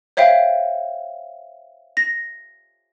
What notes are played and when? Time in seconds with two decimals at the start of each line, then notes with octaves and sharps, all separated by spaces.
0.17 C5 C#5 E5 F5 G5
1.97 A#6